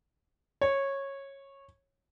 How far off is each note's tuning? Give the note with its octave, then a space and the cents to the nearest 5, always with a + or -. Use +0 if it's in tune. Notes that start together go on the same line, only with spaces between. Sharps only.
C#5 -15